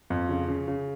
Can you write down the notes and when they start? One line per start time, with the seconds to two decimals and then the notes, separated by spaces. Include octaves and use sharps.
0.10 F2
0.29 C#3
0.48 C#3
0.68 C#3